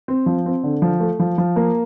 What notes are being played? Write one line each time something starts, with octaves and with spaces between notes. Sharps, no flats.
C4
F3
C4
D3
F3
A3
F3
F3
A#3